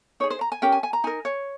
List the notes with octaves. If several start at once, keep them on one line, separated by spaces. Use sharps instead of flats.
D#4 G#4 C#5
C5
A#5
G#5
C#4 G4 A#4 G5
G#5
G#5
A#5
D#4 A#4 G#5
C#5